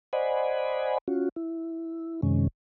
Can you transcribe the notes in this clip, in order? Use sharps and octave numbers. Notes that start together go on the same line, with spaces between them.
C5 D5 D#5 F#5 G#5 B5
C#4 F4 F#4
E4
F#2 C3 D#3 G#3 C#4